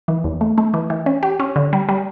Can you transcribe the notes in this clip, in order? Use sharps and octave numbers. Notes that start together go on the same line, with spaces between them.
E3
E2
A3
A3
E3
E3
C#4
G4
C#4
D3
G3
G3